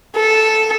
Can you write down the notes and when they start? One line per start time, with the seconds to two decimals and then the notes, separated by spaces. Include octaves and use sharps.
0.16 A4